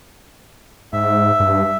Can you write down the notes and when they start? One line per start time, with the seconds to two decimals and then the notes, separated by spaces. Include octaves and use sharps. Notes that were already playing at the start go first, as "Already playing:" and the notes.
0.93 G#2 E5
1.40 G2